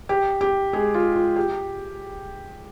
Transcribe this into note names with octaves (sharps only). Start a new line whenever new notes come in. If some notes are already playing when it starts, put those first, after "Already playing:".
G4
G4
G#3 G#4
F4
F4
G4